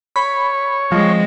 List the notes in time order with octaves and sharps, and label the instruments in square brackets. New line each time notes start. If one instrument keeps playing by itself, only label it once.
[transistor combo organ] C#5 [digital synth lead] B5
[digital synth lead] F3 [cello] G#3 C4